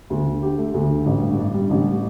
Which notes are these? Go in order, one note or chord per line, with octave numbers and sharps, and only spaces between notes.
D2
D3
G4
A3
D2
D3
A1
G2
D4
G3
A1